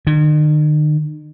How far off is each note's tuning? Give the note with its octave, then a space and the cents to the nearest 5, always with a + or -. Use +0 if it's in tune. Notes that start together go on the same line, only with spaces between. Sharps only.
D#3 -45